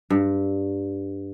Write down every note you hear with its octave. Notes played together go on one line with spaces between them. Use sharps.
G2